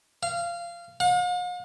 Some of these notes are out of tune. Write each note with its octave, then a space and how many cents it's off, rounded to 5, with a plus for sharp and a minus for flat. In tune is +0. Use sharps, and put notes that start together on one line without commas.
F5 -20
F5 +45